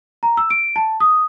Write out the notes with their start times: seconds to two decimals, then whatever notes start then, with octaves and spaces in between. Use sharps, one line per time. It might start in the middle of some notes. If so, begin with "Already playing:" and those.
0.23 A#5
0.37 E6
0.50 D7
0.76 A5
1.00 D#6